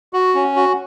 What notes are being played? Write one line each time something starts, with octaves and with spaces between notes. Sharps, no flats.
F#4
C#4
F#4